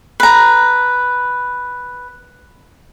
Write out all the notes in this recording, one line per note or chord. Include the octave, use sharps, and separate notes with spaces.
B4 A#5